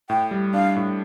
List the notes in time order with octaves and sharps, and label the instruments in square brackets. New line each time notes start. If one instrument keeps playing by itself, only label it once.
[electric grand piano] A2 [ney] G5
[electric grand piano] G3
[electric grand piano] D4 [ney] F5
[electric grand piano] A2